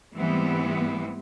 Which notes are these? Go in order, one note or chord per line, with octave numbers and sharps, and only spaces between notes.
G#2 E3 G3 A3 B3 C4